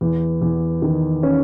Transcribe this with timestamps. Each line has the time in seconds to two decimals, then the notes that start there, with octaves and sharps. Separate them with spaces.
0.01 E2
0.42 E2
0.82 D#3
1.23 C#4